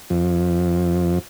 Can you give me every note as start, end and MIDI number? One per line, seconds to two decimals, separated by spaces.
0.10 1.19 41